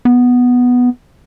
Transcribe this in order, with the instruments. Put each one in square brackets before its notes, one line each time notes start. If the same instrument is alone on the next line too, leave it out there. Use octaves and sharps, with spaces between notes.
[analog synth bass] B3